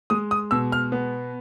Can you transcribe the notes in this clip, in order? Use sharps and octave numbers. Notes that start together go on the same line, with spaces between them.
G#3 D#6
D#6
B2 E6
F6
B3